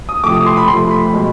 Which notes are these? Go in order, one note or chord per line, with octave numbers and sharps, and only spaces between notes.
D#6
C3 F3 A3 D6
D#6
C6
B5
C3 F3 A3 C6
B5
B2 G#3